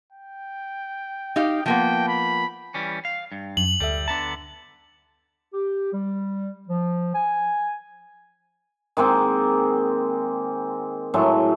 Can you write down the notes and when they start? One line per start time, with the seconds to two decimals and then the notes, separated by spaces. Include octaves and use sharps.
0.13 G5
1.36 D#4 G4 F5
1.66 F3 A#3 B3 G5
2.08 B5
2.74 E3 G3 C#4
3.05 F5
3.32 G2
3.57 F#2 F#7
3.80 D2 G3 A4 E5
4.08 D3 B3 A5 A#5
5.53 G4
5.93 G3
6.69 F3
7.14 G#5
8.97 D#3 G#3 A#3 C4
11.14 A2 F#3 G#3 A3